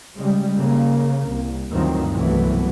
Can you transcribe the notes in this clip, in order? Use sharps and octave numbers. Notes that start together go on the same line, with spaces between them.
C#3 G3 G#3
C#3 A#3
C2
D2 G2 D#3 F3 F#3 C4
C2 B2 E3 F#3 A3 B3